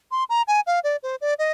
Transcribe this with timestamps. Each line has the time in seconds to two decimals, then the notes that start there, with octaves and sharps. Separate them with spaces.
0.11 C6
0.29 A#5
0.48 G#5
0.67 F5
0.84 D5
1.03 C5
1.21 D5
1.39 D#5